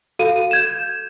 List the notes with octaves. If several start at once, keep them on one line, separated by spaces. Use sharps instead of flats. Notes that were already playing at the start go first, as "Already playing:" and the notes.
F#4 A4 F5 D#7
G6 G#6 E7